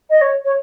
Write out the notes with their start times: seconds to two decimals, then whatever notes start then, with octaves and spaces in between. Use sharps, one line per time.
0.10 D#5
0.21 C#5
0.45 C#5